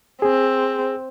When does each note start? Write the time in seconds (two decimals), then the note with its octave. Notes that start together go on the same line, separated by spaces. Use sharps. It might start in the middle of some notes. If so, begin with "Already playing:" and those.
0.22 C4 G#4